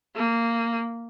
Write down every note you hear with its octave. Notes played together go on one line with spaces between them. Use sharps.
A#3